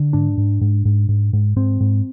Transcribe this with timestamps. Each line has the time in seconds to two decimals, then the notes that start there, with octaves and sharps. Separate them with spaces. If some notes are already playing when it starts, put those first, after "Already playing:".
Already playing: D3
0.13 G#2 D4
0.38 G#2
0.61 G#2
0.85 G#2
1.09 G#2
1.33 G#2
1.56 G#2 C4
1.81 G#2